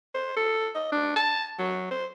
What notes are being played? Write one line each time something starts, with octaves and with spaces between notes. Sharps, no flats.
C5
A4
D#5
D4
A5
F#3
C5